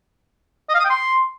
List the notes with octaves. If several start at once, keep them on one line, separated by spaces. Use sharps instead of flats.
D#5
F5
D#6
G5
C6